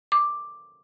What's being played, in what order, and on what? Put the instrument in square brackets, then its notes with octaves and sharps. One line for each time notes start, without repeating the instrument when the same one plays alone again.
[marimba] D6